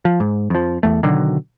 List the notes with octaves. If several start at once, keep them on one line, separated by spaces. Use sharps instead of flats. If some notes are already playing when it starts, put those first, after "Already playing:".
F3
G#2
F2 F3
E2 A3
B2 D3 D#3 F#3